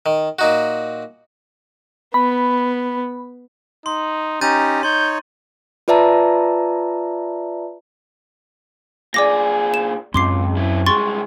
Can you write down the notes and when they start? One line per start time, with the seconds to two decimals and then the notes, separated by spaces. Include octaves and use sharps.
0.06 D#3
0.39 A#2 D#4 F#4
2.14 B3 B5
3.86 D#4 C6
4.41 C#4 D#4 G4 A#5 G6 A6 D#7
4.83 D#4 C#5 C6 G6
5.88 F4 B4 D5 E5 A5 A#5
9.14 A#2 G#4 D5 D6 A#6
9.74 E7
10.14 C#2 F#2 C4 C#4 C6 D6 C7
10.57 F#3 E4
10.86 C2 G#3 C6 C#6 A6